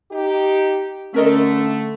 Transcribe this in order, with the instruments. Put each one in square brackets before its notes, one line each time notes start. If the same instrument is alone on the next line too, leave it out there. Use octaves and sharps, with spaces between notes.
[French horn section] D#4 G4
[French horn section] D3 A3 [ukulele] C#4 A#4 D#5